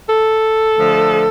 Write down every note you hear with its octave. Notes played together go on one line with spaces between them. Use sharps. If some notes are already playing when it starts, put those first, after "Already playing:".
A4
D3 F3 A3